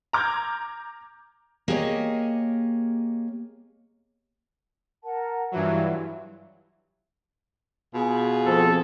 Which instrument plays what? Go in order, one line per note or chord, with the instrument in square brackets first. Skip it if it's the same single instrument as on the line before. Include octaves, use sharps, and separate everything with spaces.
[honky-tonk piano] A#5 D6 F6 G6 G#6
[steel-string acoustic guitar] A#3 G4 G#4 B4 C#5 D#5
[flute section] A#4 F#5 A5
[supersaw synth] G2 E3 F#3 [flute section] F4 E5
[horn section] B2 F4 G#4
[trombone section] F2 C4 [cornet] A4